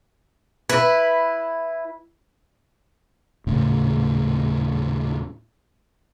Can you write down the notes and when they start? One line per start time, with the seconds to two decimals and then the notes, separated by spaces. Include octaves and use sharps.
0.69 E4 B4
3.47 D#1 A2 C#3